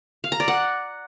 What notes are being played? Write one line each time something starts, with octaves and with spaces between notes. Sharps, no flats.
F5
A#5
D5
F#5